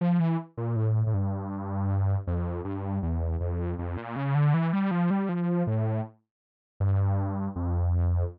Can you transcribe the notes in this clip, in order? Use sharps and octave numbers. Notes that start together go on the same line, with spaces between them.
F3
E3
A#2
A2
A2
G2
F2
G2
E2
F2
F2
A#2
C#3
D3
E3
G3
F3
G3
F3
A2
G2
F2